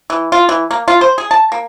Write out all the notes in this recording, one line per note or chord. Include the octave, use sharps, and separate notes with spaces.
E3
F4
E3
A#3
F4
C5
G#4
A5
A#3